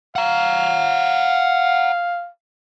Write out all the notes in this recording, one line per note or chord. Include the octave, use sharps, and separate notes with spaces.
F5 F#5 A#5